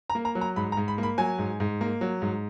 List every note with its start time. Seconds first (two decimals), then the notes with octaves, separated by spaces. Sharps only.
0.10 A#5
0.15 A#3
0.25 A#5
0.35 F#3
0.41 A#5
0.56 G#2 B5
0.72 A#5
0.77 G#2
0.88 B5
0.98 A#3
1.03 B5
1.18 F#3 G#5
1.39 G#2
1.60 G#2
1.81 A#3
2.01 F#3
2.22 G#2